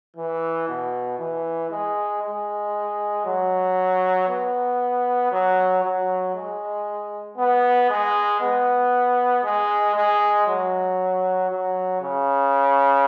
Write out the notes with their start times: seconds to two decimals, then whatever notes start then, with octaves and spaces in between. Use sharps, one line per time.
0.16 E3
0.68 B2
1.19 E3
1.71 G#3
2.22 G#3
3.25 F#3
4.29 B3
5.32 F#3
5.83 F#3
6.35 G#3
7.38 B3
7.90 G#3
8.41 B3
9.44 G#3
9.96 G#3
10.47 F#3
11.50 F#3
12.02 C#3